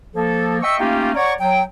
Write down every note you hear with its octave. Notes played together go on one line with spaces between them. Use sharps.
F3 A#3 A4
D#5 E5 G5 C#6 E6
A3 A#3 C#4 D#4 F4 G4
C#5 D5 F#5 A#5 C#6
F#3 G5